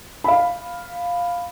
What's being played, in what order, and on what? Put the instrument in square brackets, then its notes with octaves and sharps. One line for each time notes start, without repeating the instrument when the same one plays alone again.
[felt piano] F5 B5